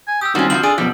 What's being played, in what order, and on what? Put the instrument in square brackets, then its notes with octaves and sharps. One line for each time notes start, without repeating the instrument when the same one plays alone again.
[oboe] G#5
[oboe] G4 [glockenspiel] D#6 E6
[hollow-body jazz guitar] D#3 G3 C4 [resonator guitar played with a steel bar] C#4 F#4 [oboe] F4
[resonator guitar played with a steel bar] F3 E4 F#4 [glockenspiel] F#7
[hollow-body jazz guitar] D4 [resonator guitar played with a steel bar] G#4 [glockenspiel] E6 D7
[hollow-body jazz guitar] F#2 B2 F3 [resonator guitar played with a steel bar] G3